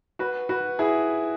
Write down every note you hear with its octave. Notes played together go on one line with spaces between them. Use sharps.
F#4 B4
F#4 B4
E4 G#4